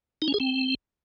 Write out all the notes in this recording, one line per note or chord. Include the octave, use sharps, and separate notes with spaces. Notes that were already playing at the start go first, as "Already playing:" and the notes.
D#4
C#4
G#4
C4